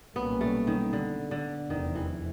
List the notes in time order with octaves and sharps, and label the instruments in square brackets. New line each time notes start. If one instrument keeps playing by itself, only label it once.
[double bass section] B1 A#2 G3 A#3 C#4 [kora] B3
[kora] A3
D#3
D3
D3
[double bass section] F1 E2 C3 [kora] D#3
[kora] E3